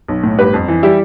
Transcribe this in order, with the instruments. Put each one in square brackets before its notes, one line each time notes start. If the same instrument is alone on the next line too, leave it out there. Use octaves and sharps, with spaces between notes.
[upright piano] B1
A2
G1 G4 B4
F2
E3
G3 E4 G4